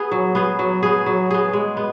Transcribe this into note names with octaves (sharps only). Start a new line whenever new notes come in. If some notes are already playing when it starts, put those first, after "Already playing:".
Already playing: B3 G#4
F#3
B3 G#4
F#3
B3 G#4
F#3
B3 G#4
G#3
B3